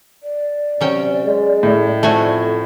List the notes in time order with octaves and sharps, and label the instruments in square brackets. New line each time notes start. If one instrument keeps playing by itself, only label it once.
[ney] D5
[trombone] C3 [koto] F#3 C#4 G5
[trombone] G#3
[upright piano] A2
[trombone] F2 [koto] A3 F#4 G#5